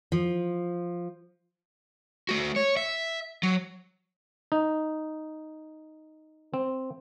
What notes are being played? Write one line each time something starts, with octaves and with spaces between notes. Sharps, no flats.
F3
A3 F#4
C#5
E5
F#3
D#4
C4